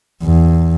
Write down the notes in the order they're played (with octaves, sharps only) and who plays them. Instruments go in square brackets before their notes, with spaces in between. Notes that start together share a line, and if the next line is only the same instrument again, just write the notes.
[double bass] E2